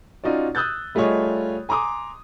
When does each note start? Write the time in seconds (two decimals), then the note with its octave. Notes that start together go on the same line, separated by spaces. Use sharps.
0.24 C#4 D#4 F4 F#4 D5
0.55 D#6 E6 F#6 G6 A6
0.95 G3 A3 F4 G#4 C#5 D#5
1.69 G#5 A#5 C6 D6 D#6